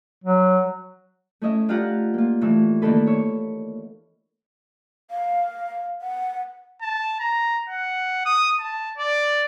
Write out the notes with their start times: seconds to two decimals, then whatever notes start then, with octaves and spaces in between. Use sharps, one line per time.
0.24 F#3
1.42 A3 C#4 E4 D#5 E5
1.69 D4 F4 G4 F5 F#5 A#5
2.14 A#3 F4
2.41 A2 E3 A3 D#4 E6
2.82 D#3 A#3 D4 A4 B4
3.07 C#5 E5
5.11 F5
6.01 F#5
6.82 A5
7.20 A#5
7.69 F#5
8.26 D#6
8.60 A5
8.98 D5